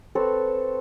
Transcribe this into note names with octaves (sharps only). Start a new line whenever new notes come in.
C4 A4 B4 C#5